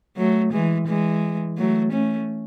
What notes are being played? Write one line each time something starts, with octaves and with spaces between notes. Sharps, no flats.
F#3 A3
E3 G#3
E3 G#3
F#3 A3
A3 C#4